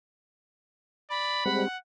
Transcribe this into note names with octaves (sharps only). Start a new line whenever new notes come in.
D5 B5
G3 G#3 C4 F#5